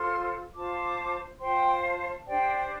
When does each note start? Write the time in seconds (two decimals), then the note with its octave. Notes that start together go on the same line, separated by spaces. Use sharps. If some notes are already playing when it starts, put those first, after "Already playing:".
Already playing: F4 A4 C5 C6 F6
0.55 F4 C5 A5 D6
1.40 F4 C5 G5 C6
1.79 G5
1.84 F5 A5
2.26 D4 G4 C5 D5 G5